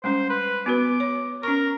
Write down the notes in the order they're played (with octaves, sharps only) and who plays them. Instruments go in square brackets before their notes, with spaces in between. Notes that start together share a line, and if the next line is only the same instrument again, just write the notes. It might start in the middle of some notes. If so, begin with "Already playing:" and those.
[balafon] G3 G#3 C#4 [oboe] C5
[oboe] B4
[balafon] B3 F#4 B4 [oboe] D6
[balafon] C#5
[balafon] C#4 C#6 [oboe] A#4